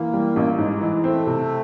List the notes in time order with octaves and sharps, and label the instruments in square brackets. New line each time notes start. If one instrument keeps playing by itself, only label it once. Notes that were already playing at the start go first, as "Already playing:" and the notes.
Already playing: [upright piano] E3 [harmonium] A#3
[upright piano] G3
A1
G#2
E3
[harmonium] A3 [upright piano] C4
[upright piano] C3